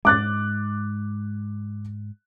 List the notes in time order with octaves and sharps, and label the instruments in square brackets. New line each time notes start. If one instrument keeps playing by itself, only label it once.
[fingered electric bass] G#2 G#3 [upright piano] D6 F#6 A6